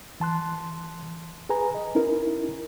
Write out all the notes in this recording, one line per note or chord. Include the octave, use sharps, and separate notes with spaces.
E3 A5 C6 F#6
G#4 B4 G#5 A#5
D#5
C#4 D#4 E4 A#4